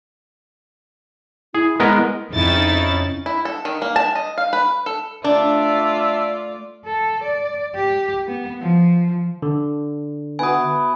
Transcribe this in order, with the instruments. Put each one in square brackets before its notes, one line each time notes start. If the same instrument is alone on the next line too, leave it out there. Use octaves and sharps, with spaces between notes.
[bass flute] E4 [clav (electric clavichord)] G#4
[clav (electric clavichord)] G#3 B3 A#4
[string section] F2 C#3 C#4 D#4 E4 A6
[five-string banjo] E4
A4
D#3
A#3
A5
D#5
F5
B4
A4
[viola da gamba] A3 F4 D5 [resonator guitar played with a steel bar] D4 [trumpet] E5
[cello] A4
D5
G4
B3
F3
[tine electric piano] D3
[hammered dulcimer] B3 E4 F#4 [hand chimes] G#5 D#6